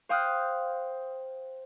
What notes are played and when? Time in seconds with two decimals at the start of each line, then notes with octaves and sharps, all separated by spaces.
0.09 C5 F5 G5 D#6 F6 F#6